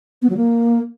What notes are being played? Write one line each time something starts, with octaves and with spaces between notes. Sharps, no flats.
B3
F#3
A#3